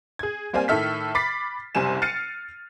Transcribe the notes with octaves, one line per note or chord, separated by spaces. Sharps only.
G#4 G#6
G3 A#3 C4 D5 F5 G#5
A2 D#3 A4 E5 F6 B6
B5 D6 A6 B6 C7
F#1 C3 G3 G#5 E7
F6 A6 C7 C#7 D#7